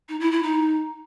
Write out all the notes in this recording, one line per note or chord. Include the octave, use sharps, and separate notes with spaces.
D#4
E4
E4
D#4